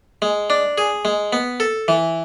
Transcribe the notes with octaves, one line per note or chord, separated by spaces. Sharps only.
G#3
D4
G#4
G#3
B3
A4
E3